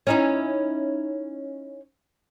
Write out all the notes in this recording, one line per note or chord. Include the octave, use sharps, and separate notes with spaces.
C#4 D#4 E4